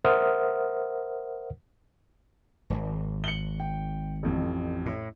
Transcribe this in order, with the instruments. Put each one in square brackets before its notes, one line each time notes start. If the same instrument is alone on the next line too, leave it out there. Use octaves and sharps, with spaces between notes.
[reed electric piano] A#4 C5 E5 F#5 D#6 F6
[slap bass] D1 G#1
[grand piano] C#7 F#7 G7
G5
A1 F2
[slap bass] A2